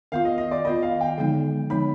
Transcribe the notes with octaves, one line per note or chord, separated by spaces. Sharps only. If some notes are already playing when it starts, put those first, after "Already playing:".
D#3 B3 F4 F5
D#5
D#5
D5
D#3 B3 F4 D#5
F5
G5
D3 F3 G#3 B3 D#4
D3 F3 G#3 B3 D#4 B5